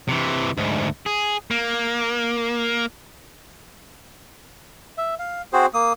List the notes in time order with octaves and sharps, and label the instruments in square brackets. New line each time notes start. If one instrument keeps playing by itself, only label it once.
[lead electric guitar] C3 E3
D2 G#2
G#4
A#3
[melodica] E5
F5
C4 F#4 G#4 C5
A#3 D#6